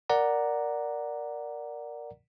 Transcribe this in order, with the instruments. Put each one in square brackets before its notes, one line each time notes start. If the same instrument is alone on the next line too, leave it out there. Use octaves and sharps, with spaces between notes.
[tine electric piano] A#4 D5 F#5 A#5